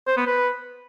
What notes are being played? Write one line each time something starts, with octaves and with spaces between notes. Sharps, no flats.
C5
B3
B4